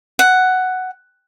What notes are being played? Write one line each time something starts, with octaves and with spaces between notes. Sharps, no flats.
F#5